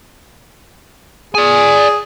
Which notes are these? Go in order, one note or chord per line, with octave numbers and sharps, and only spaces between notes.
G#4 D5 G#5